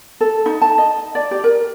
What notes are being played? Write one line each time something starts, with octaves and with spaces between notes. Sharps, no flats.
A4
D#4
A5
D#5
D5
G4
A#4